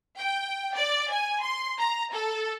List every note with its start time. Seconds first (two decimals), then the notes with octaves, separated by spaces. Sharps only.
0.18 G5
0.74 D5
1.10 G#5
1.43 C6
1.79 A#5
2.12 A4